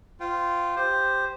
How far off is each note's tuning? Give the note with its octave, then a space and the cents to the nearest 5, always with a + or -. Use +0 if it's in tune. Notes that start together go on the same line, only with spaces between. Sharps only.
F4 -5 C5 -25 G5 -20
G4 +0 C5 +0